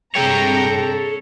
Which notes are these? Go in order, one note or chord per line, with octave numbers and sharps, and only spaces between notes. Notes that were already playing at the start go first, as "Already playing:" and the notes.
G2 C3 G#4 A4 C#5 G5 A#5